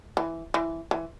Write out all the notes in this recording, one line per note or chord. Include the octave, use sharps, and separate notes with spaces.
E3
E3
E3